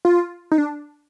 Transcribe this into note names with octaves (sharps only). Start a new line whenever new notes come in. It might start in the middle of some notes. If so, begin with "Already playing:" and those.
F4
D#4
D4